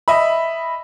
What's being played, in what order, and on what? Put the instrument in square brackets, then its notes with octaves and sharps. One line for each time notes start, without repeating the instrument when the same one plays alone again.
[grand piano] D#5 E5 B5